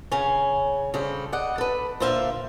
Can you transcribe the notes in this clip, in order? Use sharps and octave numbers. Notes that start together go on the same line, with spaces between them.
C#3 C#4
C#3 G3 A4 C5
D5 D#5 F#5
A4 B4
A#2 D3 C5 E5 F5